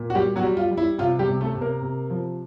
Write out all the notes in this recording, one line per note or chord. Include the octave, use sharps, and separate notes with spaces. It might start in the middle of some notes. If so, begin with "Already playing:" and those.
Already playing: A#2
F#4
G3 G4
F#3 F#4
G3
F4
G3
E4
C3 F4
G3 G4
C3
A3 A4
C3
A#3 A#4
C3
F3